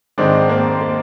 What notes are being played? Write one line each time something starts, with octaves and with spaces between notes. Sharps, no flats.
G#2 D#3 G#3 C4 D4
A#3 C4
A#3